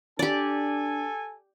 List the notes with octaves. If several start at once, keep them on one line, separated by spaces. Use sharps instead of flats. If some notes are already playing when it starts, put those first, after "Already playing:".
D4 G4 A4 D5 G#5